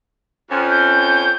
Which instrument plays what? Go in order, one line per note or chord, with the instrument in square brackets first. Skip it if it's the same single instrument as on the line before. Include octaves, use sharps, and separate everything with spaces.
[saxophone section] F2 C#4
[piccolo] G6